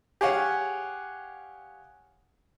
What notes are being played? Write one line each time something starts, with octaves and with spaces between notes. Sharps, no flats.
G4 G#4 C#5 F5 F#5